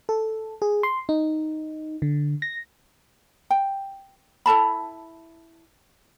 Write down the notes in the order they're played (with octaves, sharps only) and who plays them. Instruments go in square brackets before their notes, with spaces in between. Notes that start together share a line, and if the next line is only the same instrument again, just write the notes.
[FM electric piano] A4
G#4
C6
D#4
D3
A#6
[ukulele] G5
E4 A4 A5 B5